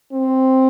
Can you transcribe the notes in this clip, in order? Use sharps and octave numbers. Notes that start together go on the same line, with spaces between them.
C4